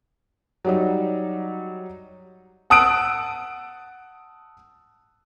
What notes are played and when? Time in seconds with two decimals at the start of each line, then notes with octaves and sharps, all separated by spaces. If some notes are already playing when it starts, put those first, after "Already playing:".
0.65 F#3 G3 D#4
2.70 F#5 A5 D#6 E6 F#6 D7